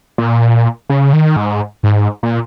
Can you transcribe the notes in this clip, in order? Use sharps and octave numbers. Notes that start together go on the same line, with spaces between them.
A#2
C#3
D#3
G#2
G#2
A#2